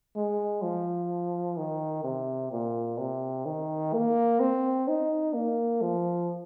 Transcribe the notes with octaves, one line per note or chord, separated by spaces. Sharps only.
G#3
F3
D#3
C3
A#2
C3
D#3
A#3
C4
D#4
A#3
F3